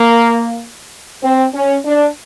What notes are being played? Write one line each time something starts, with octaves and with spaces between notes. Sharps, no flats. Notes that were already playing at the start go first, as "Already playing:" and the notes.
Already playing: A#3
C4
C#4
D4